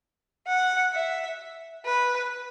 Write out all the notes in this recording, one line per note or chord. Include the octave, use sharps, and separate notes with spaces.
F#5
E5
B4